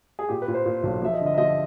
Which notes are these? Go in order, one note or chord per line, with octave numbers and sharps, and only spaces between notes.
G#4
A#2 G4
B4
A#2
C5
A#2
B1
F3 E5
D#5
D3
D#5
E5
F3 D#5